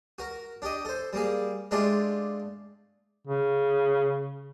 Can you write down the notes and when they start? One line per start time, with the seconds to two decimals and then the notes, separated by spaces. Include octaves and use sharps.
0.19 F#4 A#4
0.62 D4 G4 D#5
0.85 A4 C5
1.13 G3 A#3 G#4
1.71 G#3 A3 D4 F4 G4 D5
3.27 C#3